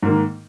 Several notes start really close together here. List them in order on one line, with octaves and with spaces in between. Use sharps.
G#2 A#3 D#3